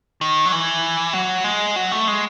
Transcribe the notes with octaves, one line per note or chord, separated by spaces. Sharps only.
D#3
F#3
E3
F#3
G#3
F#3
A3
G#3